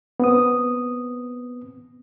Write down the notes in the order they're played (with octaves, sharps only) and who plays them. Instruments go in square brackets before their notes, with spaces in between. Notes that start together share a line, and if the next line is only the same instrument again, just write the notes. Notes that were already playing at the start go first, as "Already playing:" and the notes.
[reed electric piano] B3 C4 D#6